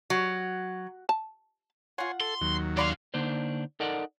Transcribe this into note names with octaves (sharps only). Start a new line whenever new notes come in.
F#3
A5
F4 C#5 F#5 G#5 C6
A4 C6
D#2 F#3
C#3 D5 F5 B5 C6
D3 A#3 D4 D#4 C5
D#4 A4 A#4 D5 F#5